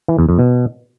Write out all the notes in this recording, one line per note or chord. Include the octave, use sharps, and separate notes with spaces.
E3
E2
F2
B2